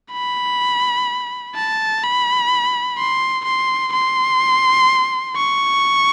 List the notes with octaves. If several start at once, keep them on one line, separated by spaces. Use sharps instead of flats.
B5
A5
B5
C6
C6
C6
C#6